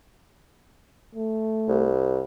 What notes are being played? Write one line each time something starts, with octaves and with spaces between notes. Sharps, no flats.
A3
C2